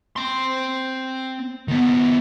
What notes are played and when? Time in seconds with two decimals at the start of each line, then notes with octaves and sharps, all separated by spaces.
0.16 C4 C6
1.68 D#3 B3